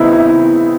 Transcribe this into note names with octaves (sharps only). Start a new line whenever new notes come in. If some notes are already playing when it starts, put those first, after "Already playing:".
Already playing: C#3 B3 C4 D#4 E4
E4